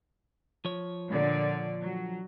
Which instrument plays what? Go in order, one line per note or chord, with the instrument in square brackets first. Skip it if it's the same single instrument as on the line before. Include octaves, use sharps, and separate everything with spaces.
[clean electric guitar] F3 C#5
[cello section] A#2 D3 D5
F#3